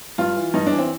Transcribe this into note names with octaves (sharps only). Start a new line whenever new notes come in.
G2 F4
E3
G2 D#4
D4
E3
C4